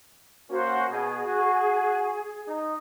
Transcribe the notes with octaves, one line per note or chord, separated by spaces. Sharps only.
A#3 C#4 F#4 C5
B2 G#4
F#4
D#4